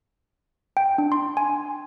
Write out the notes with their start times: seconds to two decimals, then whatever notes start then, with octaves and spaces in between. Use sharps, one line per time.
0.77 G5
0.98 D4
1.12 C6
1.37 G#5